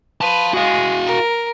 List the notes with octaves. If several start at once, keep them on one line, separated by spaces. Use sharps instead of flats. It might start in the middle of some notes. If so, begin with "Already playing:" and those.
B4 F5 A5
G#3 F#4 F5
A#4